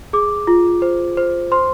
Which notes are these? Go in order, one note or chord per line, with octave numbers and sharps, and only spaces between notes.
G#4 D6
F4
C5
C5
C5 C6